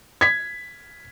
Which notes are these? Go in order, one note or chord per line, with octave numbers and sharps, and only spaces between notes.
G#6 B6